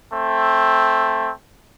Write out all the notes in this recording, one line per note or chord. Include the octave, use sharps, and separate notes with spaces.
A3 C4